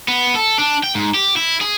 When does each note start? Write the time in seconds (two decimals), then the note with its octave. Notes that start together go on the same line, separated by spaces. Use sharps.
0.08 B3
0.35 A4
0.58 D4
0.84 G5
0.95 G#2
1.14 G4
1.37 E4
1.61 G#4